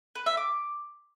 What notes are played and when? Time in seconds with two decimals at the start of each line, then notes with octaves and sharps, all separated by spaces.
0.15 B4
0.26 E5
0.37 D6